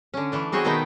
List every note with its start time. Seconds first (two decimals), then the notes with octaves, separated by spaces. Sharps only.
0.14 D3 C#4
0.32 E3 A3 D4
0.52 B3 C4 F#4 G#4 C#5 D#5
0.64 B2 D#3 A3 B3 D#4 G5